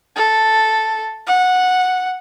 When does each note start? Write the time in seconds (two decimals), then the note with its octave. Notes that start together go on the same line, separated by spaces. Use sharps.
0.16 A4
1.27 F#5